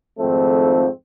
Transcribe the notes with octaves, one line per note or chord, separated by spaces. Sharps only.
G#1 F2 G#2 F3 A3 C4